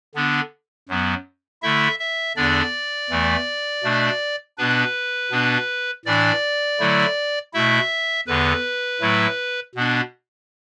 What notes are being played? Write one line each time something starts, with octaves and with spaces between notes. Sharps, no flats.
D3 B3 D4
F#2 F#3 B3
D3 A3 E4 E5
E5
E2 D3 B3 D4 D5
E2 E3 A3
B2 A3 D4
B2 B3 D4 B4
B2 B3 D4
A2 E3 D4 D5
D3 F#3 A3 E4
B2 A3 E4 E5
E2 D3 B3 B4
A2 F#3 A3 E4
B2 B3 D4